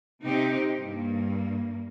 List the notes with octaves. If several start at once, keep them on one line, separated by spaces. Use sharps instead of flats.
C3 C4 D#4 G4
G2 A#3